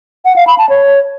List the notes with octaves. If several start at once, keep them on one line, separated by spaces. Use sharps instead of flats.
F#5
F5
B5
A5
C#5